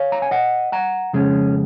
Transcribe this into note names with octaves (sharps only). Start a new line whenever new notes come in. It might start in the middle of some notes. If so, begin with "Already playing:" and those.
Already playing: C#5 F5
A#5
G#5
D#5 F#5
F#5 A#5
F2 C#3 G#3 C#4